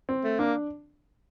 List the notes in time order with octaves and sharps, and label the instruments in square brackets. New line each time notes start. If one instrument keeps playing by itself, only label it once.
[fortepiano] C4
[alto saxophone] A3
[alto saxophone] A#3 [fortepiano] D4